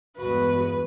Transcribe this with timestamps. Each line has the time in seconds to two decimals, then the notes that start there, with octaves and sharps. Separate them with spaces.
0.18 E2 G2 G#3 F#4 B4